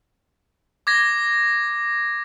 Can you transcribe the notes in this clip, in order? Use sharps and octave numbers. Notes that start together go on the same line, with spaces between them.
D6 G#6 A#6